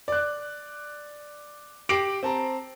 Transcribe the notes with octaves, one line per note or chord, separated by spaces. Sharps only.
D5 F#6
G4 D6 A#6 C7 D7 F#7
C4 A5 A#5